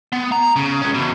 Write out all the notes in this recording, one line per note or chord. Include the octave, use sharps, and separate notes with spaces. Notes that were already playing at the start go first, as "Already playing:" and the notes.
B3
A#5
C#3
G#3 C#4
E2 B2